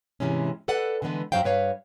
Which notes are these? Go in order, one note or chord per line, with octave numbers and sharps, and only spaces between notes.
G#2 C3 E3 G#3 C#4
A4 B4 D5 F#5
D3 E3 G#3 B3 B4
F#2 E3 F#3 C5 F5 G5
G2 B4 C#5 F5